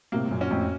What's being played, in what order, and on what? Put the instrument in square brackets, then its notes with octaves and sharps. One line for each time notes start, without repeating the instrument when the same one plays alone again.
[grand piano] A2 C3 [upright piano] A#3
[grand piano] A2
F#2 A#2
[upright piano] C#4 F#4
[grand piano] F2 A2